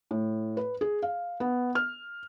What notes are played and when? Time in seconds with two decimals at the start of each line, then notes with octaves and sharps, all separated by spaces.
0.11 A2
0.57 B4
0.81 G#4
1.03 F5
1.40 B3
1.75 F6